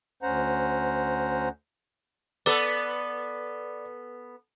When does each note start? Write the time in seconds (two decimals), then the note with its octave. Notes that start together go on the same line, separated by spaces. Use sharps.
0.23 D2 C#4 C5 F#5 A#5
2.46 B3 A4 D5